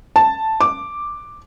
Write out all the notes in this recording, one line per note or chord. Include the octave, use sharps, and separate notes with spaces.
A5
D6